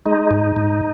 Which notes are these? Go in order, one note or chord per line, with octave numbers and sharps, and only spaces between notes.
G#3 D#4
G#2
G#2